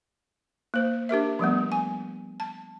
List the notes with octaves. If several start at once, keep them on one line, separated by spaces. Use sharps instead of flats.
A#3 C5
D4 G4 A#4 E5
F3 G3 A3 B3
G#5
A5